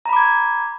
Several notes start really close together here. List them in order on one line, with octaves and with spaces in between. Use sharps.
A#5 B5 D6 G#6